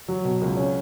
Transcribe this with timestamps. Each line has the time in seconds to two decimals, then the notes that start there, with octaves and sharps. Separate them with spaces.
0.08 F#3
0.25 B2
0.41 C#2
0.57 C#4